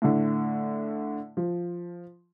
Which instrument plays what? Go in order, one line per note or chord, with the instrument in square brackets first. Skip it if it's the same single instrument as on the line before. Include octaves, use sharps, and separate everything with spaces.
[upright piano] A2 D3
F3